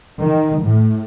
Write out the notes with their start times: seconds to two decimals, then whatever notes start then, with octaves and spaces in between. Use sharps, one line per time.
0.21 D#3
0.63 A2